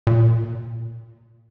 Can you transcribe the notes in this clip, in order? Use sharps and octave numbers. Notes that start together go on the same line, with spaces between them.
A#2